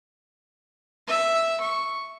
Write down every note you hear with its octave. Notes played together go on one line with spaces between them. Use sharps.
E5
C#6